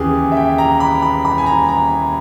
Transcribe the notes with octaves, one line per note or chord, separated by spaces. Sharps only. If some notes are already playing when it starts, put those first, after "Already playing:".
Already playing: D#2 C#3 E3 G4 G#4
E5
G5
A#5
B5
B5
B5
G#5
A#5
A#5